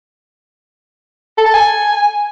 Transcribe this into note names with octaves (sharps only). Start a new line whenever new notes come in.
A4
A5
G#5